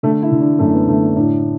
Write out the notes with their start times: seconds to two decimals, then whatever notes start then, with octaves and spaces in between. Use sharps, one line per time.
0.03 D3 A3
0.22 E4
0.32 D3
0.40 D4
0.59 F#2 A3
0.74 B3
0.88 D3 A3
1.02 D4
1.16 A2 D4